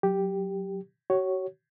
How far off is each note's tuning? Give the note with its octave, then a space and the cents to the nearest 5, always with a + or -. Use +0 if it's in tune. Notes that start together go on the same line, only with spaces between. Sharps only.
F#3 +0 G4 +0
F#4 +35 C#5 +0